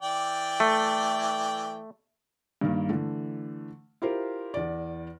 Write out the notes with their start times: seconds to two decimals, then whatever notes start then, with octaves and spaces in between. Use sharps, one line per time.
0.03 E3 D5 G5
0.60 A3
2.61 G2 D#3 A#3
2.89 D3 E3 A3
4.02 E4 F4 G4 A#4 C5
4.54 E2 D5